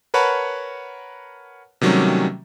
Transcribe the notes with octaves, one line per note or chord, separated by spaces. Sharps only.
A#4 B4 C#5 F#5 A5 B5
C3 D#3 F#3 G3 A3 C#4